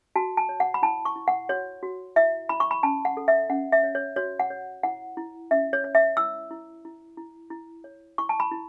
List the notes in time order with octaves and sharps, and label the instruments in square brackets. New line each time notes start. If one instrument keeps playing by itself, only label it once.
[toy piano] F#4 A5
A5
C#5
F#5
B5
E4 A5
C#6
E4
F#5
F#4 C#5
F#4
E4 E5
E4 B5
C#6
B5
C#4 A5
F#5
A4
E5
C#4 F#5
E5
C#5
C#5
F#4 C#5
F#5
C#5
E4 F#5
E4
C#4 E5
C#5
C#5
E5
E4 E6
E4
E4
E4
E4
C#5
E4 C#6
A5
B5
E4